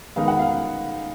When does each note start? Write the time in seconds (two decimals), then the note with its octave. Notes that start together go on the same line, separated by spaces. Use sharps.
0.16 D#3 G#3 B3 D#4 F5
0.28 F#5
0.39 F5
0.50 F5